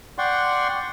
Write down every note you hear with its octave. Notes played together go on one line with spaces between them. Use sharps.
D5 F#5 G5 C6 C#6